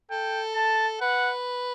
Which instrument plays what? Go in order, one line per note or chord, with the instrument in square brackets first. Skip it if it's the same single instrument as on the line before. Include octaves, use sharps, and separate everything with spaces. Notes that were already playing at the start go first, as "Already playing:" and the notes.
[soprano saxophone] A4 [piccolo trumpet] G5
[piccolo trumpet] A5
[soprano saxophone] B4 [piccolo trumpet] F#5